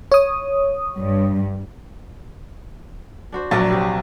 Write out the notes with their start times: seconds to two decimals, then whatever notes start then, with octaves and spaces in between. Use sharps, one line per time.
0.12 C#5 D#6
0.96 G2
3.32 D4 F#4 C5
3.51 A#1 F#3 D4 A#4 C#5 A6
3.69 C3 G4 B4